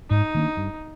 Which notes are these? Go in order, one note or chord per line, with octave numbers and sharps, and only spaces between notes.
G#2 D#4
D#3 A#3 D4
G2